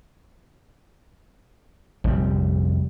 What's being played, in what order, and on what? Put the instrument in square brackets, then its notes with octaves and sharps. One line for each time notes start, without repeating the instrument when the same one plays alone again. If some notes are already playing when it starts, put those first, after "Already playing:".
[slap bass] F1 G3 [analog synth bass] A#1